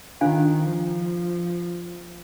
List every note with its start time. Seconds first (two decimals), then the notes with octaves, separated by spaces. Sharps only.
0.21 D#3 D4 F4 C5 F5 G#5
0.66 F3